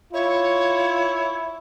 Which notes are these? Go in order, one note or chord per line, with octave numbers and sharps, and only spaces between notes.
E4 F4 C#5